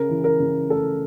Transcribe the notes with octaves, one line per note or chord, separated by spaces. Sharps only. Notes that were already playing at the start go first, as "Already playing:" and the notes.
Already playing: C#3 A#4
E3
A#4
C#3
A3 A4